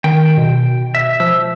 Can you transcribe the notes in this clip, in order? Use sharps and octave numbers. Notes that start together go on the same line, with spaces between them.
D#3 G5
B2
E5
F3 E6